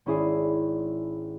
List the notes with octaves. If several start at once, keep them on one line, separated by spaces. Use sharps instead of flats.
G#1 C#4 E4 G#4 D5 C7